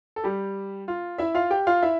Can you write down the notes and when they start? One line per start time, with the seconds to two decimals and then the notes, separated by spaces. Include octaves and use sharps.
0.16 A4
0.24 G3 G4
0.88 F4
1.18 E4 E5
1.34 F4 F5
1.51 G4 G5
1.67 F4 F5
1.83 E4 E5